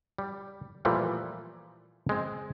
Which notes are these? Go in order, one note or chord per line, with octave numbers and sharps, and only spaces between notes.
G3
A#2 E3 F3 G3 A3
G#3 C4